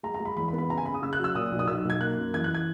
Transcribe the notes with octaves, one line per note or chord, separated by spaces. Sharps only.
G#3 A#5
A#5
G#3
B5
E2 B5
B5
B3
B5
C#3 A#5
G#5
C#3 B5
D#6
C#3 E6
F#6
F#3
E6
A#2 D#6
B1
D#6
B1 E6
B1 G#6
A#3 F#6
F#2
E3 G#6
F#6
G#6